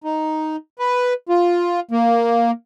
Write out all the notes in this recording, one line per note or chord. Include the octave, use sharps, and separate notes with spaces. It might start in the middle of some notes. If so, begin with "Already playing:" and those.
D#4
B4
F4
A#3